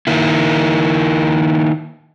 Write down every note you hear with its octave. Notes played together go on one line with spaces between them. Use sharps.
D#3 A#3 E4